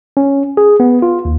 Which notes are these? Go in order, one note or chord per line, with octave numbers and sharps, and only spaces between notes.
C#4
G#4
B3
F4
D#2